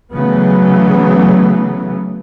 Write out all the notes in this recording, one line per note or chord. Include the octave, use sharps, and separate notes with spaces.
C#3 E3 F#3 A3 B3